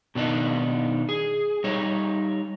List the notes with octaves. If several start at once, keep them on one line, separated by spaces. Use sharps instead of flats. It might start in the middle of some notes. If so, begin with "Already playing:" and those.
B2 D#3 D4 D#4
G#4
G3 D#4 C#5